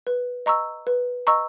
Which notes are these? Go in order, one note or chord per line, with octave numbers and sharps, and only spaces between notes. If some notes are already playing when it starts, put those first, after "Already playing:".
B4
D#5 A#5 C#6 E6
B4
D#5 A#5 C#6 E6